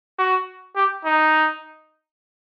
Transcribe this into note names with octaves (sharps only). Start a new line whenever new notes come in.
F#4
G4
D#4